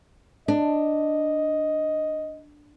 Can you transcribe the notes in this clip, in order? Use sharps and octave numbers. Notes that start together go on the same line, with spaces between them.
D4 D#5